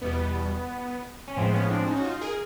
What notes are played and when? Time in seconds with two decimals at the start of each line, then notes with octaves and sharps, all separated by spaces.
0.01 E2 B2 G3 B3
1.28 C#4
1.36 A2 F3 G#3 B3 C4
1.54 B3 C#4
1.71 C4 D4
1.87 C#4 D#4
1.96 F#4
2.04 D#4 F4
2.21 G#4 A#4